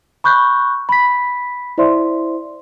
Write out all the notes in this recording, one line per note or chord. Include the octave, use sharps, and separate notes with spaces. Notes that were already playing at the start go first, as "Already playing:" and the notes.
B5 C#6 F#6 G6
B5 B6
E4 C5 D5 E5 C6